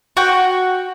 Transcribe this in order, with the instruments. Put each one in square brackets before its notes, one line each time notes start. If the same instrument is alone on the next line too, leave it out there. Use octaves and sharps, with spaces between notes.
[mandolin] F#4 G5